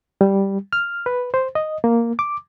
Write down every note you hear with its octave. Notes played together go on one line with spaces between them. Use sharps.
G3
F6
B4
C5
D#5
A#3
D6